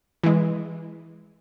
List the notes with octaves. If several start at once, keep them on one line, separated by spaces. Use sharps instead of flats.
E3 G#3